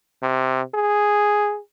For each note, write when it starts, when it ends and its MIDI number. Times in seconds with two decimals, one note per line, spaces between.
0.22 0.62 48
0.74 1.59 68